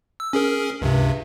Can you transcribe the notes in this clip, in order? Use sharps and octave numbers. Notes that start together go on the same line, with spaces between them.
E6
C#4 G#4 A#4
C#2 G2 C3